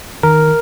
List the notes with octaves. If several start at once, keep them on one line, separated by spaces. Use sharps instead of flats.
D#3 A#4